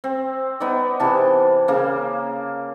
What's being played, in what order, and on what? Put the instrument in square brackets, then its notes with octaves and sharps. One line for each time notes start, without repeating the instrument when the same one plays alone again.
[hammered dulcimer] C4
B3 D#4 D5
C3 E3 A5
C#3 A#3